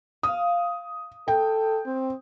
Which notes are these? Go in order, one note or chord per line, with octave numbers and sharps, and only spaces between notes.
F5 D#6
A4 G5
C4